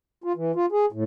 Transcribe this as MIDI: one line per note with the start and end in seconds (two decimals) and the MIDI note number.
0.24 0.32 65
0.36 0.52 52
0.55 0.66 65
0.72 0.86 68
0.92 1.04 45